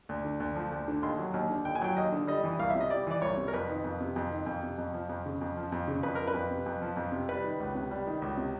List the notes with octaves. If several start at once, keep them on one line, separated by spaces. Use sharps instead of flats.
D2
D3
D2
F3
D2
D3
D#2 C6
F#3
D#2
D3
D#2 G5
G#5
F#3 G5
D#2 D#5
D3
G3 D#5
E3
C2 F5
C3 E5
D#5
G3 D5
E3 D5
C2 C#5
C3
A#4
F2 B4
D#3
F2
C3
F2
D#3
F2
C3
F2
F3
F2
C#3
F2
F3
F2
C#3
F2 B4
F3 A#4
B4
F2
C3
F2
F3
F2
C3
G3 B4
D#3
C#2
C3
G3
D#3
C#2
C3